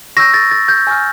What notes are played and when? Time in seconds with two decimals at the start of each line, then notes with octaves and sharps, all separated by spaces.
0.17 C#6 E6 G6 A#6
0.34 A6
0.51 A6
0.68 G6
0.87 G#5 C#6 F6